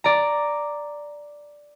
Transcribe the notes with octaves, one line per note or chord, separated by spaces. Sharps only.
D5 A#5